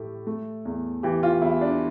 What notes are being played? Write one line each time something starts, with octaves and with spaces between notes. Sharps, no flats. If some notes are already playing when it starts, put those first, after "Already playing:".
Already playing: A2 A3 G4 A4
A3
E2
E3 G4
F4
E2 E4
D4